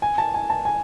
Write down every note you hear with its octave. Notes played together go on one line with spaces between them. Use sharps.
G#5
A5
G#5
A5
G#5